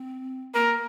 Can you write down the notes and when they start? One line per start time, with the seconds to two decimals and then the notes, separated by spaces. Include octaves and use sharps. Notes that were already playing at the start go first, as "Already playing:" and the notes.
Already playing: C4
0.54 A#3 A#4